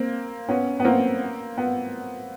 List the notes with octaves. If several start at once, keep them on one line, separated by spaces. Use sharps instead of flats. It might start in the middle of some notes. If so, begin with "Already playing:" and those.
Already playing: A#3 C4
B3 C#4
B3
A#3 C4
B3